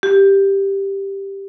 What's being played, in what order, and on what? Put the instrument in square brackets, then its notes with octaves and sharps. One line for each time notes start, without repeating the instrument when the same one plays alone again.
[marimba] G4